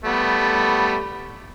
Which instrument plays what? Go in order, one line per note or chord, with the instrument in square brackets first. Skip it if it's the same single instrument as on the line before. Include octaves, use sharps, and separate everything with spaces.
[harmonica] G3 A3 B3